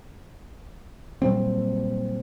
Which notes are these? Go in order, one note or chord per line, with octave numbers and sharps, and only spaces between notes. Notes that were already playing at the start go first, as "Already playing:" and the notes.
A#2 F#3 G3 C4